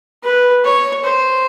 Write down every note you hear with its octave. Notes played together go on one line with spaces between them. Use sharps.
B4
C#5
C5